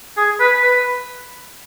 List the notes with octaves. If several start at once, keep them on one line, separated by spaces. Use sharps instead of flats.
G#4
B4
B4